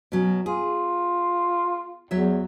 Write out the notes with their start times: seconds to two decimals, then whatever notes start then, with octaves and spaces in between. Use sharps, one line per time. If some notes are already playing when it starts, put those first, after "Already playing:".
0.12 B2 F#3 C#4
0.46 F4 G#4
2.11 E2 F#3 C#5 E5